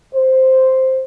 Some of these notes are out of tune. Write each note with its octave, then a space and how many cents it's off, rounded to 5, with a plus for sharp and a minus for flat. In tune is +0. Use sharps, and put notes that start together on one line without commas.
C5 +0